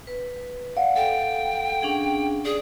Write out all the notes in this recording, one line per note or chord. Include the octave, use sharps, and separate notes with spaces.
B4
D5 F5 F#5
A4 G5
C#4 D4 G#4
G#4 D5